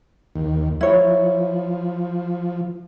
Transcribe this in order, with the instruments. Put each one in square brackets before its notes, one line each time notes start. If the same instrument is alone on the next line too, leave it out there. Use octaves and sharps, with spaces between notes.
[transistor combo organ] D#2
[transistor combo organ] F3 [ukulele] E4 C#5